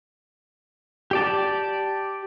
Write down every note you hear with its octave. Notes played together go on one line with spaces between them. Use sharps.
G4 D5 A5